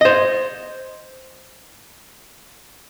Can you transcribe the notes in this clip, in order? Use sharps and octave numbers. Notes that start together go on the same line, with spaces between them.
C5 D#5